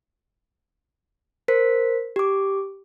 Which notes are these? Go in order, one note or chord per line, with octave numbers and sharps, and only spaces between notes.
A#4 C5 B6
G4 D6